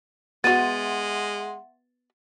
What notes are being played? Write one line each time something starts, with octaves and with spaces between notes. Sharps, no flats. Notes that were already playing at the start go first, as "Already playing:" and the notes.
G#3 B3 F#4 E5 F#5 C6 A6 D#7